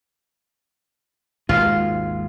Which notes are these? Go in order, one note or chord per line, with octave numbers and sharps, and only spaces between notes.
G#1 D#2 G#3 F4